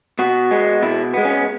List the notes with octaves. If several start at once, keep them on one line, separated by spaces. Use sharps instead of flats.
B2 F#4
G#3 B3
B2 E4
G#3 B3
C#4